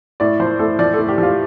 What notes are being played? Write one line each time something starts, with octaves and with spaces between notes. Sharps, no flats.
A2 D5
F3 C5
A2 A4
F3 D5
A2 A4
G4
F3 F4